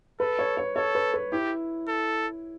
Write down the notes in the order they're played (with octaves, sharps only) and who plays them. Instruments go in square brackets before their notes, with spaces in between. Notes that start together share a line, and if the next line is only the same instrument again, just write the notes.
[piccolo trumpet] A4 [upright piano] B4
[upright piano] C#5
C#5
[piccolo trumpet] A4 [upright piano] C#5
[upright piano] B4
B4
[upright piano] E4 [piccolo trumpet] G4
[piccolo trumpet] A4